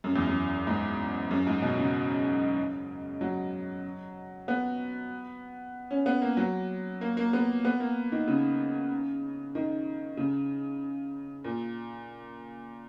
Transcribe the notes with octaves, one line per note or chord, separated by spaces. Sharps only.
F#2
E2
F#2
G#2
F#2
G#2
B2
C#3
F#3
B3
C#4
B3
A#3
F#3
A#3
A#3
B3
B3
A#3
D#3
C#3
D#3
C#3
A#2